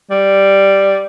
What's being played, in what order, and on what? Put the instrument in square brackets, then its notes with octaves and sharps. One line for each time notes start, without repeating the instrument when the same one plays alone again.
[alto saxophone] G3